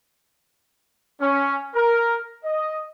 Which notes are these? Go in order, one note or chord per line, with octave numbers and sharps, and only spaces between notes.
C#4
A#4
D#5